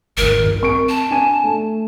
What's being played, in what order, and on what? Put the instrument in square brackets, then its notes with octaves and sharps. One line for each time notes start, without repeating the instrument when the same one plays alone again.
[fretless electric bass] G#1 D#2 D#3 [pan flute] A#4
[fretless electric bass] A#1 G2 A#2
[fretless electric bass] C4 [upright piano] C#6 D7
[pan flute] A5
[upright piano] D4 G#5 D#7
A3